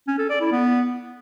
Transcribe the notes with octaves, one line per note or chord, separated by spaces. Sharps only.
C#4
A4
D5
E4
B3